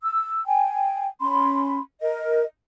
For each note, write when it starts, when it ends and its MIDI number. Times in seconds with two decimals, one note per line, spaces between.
0.01 0.42 88
0.46 1.06 79
0.46 1.06 80
1.21 1.77 61
1.21 1.77 83
1.21 1.77 84
2.01 2.43 70
2.01 2.43 75